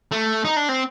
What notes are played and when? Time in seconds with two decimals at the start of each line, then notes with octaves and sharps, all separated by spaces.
0.12 A3
0.45 D#4
0.57 D4
0.69 C4